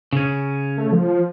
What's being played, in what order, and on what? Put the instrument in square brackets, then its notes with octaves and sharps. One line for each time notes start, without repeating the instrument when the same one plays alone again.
[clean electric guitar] C#3 C#4
[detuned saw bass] A3
F3